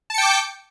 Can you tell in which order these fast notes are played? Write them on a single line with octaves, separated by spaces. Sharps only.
A5 C#7 G5 D6 G6